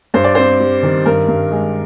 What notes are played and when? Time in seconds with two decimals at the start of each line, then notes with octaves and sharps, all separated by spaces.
0.14 G2 C5
0.24 D5
0.35 C4 C5
0.60 G3
0.83 D#3
1.06 G2 A#4
1.28 G2
1.51 G#3